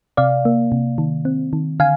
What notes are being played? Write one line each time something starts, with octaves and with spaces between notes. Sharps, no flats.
C3 D5 F5
A#3
C3
D#3
C4
D#3
D3 F5 G#5